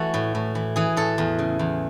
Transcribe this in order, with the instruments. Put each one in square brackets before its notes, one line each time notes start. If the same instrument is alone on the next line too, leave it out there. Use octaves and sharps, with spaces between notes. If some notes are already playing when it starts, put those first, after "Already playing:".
Already playing: [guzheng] E3 A3 F#4 A4
A2
A2
E3
E3 G#4
A2 A4
E2
C#3
E2